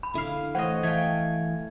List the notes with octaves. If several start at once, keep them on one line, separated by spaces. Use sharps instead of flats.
B5
D3 E4 E5 F5
E3 A3 C5 C#5 D#5 F#5
E3 A3 F5 G5 G#6